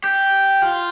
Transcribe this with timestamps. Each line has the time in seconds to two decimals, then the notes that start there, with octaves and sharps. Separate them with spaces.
0.04 G4
0.62 F4